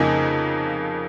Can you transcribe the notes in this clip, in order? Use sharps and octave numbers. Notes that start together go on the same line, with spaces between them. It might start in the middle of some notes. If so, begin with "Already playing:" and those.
Already playing: F2 C#3 A#3 D#4 G#4